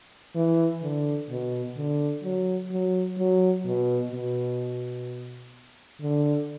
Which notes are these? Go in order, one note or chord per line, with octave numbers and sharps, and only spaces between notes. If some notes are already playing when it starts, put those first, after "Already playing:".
E3
D3
B2
D3
F#3
F#3
F#3
B2
B2
D3